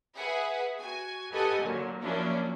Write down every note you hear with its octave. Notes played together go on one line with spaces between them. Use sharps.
G#4 B4 E5 F#5 G#5
F#4 G#5
G4 A4 B4 D#5 F#5 G#5
A#2 D3 F#3 A#3
F3 F#3 A#3 C#4 D4 E4